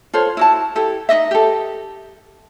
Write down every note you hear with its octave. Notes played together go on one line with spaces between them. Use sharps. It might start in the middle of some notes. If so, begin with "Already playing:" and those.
F4 A4 C5 C#5
E4 F#4 A5
E4 G4 A4
D#4 F#4 D#5 E5
G4 A4